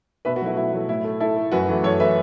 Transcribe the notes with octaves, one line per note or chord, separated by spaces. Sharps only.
B2 B4 E5
F#4 B4
F#3 A3 E4
B2 E4
F#3 A3
A2 E4
A3
A2 E4 A4
A3
F#2 F#4 B4
E3 A3
F#2 A4 C#5
E3 A3 B4 E5